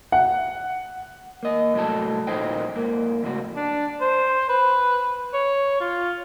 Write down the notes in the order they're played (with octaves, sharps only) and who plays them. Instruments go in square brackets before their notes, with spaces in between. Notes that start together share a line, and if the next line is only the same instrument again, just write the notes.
[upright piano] F#5
[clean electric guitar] A#3 D#5
C2 A2 F#3 A4 A5
A#2 F3 D#4 C5 D#5 G5
G#2 A#3
F2 A2 C#3 F#4
[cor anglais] D4
C5
B4
C#5
F4